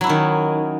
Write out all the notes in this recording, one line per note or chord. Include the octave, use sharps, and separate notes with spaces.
D#3 F#3 C#4 E4